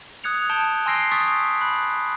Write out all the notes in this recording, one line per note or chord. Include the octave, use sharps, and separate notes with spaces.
D#6 F#6 G#6 C#7 F7
A5 G6 D7 G7
G#5 C6 E6 A#6 C7 D7
C#6 D#6 E6 A6 B6
B5 F#6